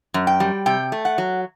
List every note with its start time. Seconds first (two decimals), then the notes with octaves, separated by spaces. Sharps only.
0.14 F#2
0.27 G5
0.40 G3
0.66 C3 G5
0.92 A3
1.05 F#5
1.18 F#3